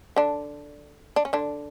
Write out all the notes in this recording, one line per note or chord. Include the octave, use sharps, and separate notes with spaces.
D3 D4
D4
C#4
D3 D4